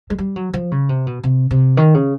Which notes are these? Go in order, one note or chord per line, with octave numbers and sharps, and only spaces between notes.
G#3
G3
F#3
F3
C#3
C3
B2
C3
C3
D#3
C#3